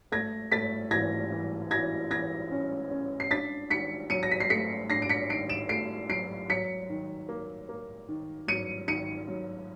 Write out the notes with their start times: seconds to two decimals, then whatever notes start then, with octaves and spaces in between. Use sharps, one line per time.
0.12 A3 G#6 A#6
0.52 A3 A6 B6
0.91 E3 G#6 A#6
1.32 E3
1.71 E3 G#6 A#6
2.11 E3 G#6 A#6
2.51 C#4
2.91 C#4
3.20 C7
3.31 D4 A6 B6
3.70 D#3 B6 C#7
4.10 F#3 C#7 D#7
4.23 A#6
4.31 B6
4.40 C7
4.50 A3 B6 C#7
4.90 D4 A#6 C7
5.02 D7
5.09 B6 C#7
5.30 D#3 C7 D7
5.49 D7 E7
5.69 A3 C7 D7
6.09 F#3 C7 D7
6.50 F#3 B6 C#7
6.90 D#3
7.29 A#3
7.69 A#3
8.09 D#3
8.48 F#3 C#7 D#7
8.88 D#3 C#7 D#7
9.28 F#3